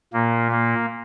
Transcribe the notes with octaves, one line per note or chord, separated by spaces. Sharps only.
A#2 A#3
A#3